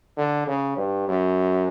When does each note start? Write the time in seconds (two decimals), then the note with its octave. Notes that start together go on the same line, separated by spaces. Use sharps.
0.18 D3
0.47 C#3
0.77 G2
1.08 F#2